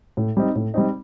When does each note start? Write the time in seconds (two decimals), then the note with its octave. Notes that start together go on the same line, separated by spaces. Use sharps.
0.17 A2
0.37 G3 C4 D#4
0.55 A2
0.74 G3 C4 D#4